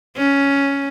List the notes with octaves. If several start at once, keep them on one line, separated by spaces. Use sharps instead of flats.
C#4